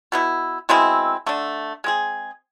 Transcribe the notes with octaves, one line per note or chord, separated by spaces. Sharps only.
B2 B3 E4
B2 G#3 C4 E4
D3 A3 D4
G#3 C4 G#4